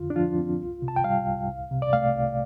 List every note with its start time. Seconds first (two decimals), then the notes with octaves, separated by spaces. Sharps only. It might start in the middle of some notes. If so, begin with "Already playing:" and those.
Already playing: F2 D3 F4
0.10 D4
0.16 F3 F4
0.38 C4
0.61 C2
0.82 C3
0.88 A5
0.96 G5
1.04 G3 F5
1.26 C2
1.49 C2
1.71 C3
1.82 D5
1.93 A3 F5
2.15 C2